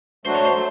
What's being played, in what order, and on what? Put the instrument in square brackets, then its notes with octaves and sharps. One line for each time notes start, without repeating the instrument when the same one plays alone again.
[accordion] F#3 A3 D4 F#4 [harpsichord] C5
[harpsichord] C#5
C5
[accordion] F#3 A3